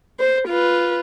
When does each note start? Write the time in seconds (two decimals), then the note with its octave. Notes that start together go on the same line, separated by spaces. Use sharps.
0.19 C5
0.48 F4 B4